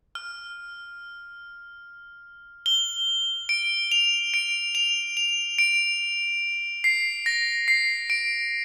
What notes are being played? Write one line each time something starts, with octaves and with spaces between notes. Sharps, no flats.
F6
G7
D7
F7
D7
F7
F7
D7
C7
A#6
C7
D7